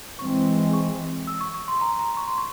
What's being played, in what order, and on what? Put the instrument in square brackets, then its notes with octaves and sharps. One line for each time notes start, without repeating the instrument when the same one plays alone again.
[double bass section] E3 G#3 C4 [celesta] C#6
[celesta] C#6
E6
C#6
C#6
C6
A#5
A#5
C#6
C6
C#6